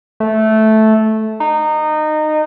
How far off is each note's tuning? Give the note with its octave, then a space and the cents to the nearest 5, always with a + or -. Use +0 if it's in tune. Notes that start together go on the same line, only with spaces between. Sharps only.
A3 -10
D#4 -20